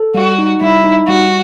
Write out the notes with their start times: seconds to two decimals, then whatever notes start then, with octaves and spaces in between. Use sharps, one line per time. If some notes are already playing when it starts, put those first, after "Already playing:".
Already playing: A4
0.15 G3 F#4
0.39 D#4
0.61 G3 E4
0.84 D#4
1.08 G3 F#4